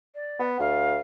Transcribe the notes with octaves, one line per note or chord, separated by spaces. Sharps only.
D5
B3
D2 F5